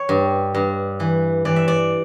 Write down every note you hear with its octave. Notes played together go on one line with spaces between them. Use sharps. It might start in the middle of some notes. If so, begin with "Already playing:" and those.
Already playing: C#5
G2
G2
E3
E3 D5
E5
D5